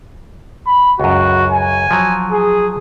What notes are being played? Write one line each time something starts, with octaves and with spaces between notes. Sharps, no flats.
B5
C#2 F#2 F#4
G#5
F3 F#3
G#4